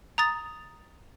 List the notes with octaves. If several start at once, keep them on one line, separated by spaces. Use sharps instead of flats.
A#5 D#6 A6